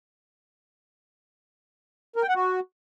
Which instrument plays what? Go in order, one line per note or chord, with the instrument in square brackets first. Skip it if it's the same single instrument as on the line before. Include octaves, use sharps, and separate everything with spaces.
[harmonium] A#4
G5
F#5
F#4